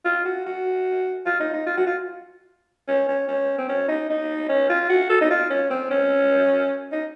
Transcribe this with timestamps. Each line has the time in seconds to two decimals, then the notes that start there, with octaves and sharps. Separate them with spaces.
0.05 F4
0.25 F#4
0.46 F#4
1.26 F4
1.40 D#4
1.53 D#4
1.67 F4
1.77 F#4
1.87 F4
2.88 C#4
3.08 C#4
3.28 C#4
3.58 C4
3.69 C#4
3.88 D#4
4.10 D#4
4.49 C#4
4.69 F4
4.89 F#4
5.10 A4
5.21 D#4
5.31 F4
5.50 C#4
5.70 C4
5.91 C#4
6.92 D#4